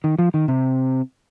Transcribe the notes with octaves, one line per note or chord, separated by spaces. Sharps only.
D#3
F3
D#3
C3